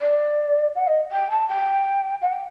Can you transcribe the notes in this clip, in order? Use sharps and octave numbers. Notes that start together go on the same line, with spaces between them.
D5
F#5
D#5
G5
A5
G5
F#5
G5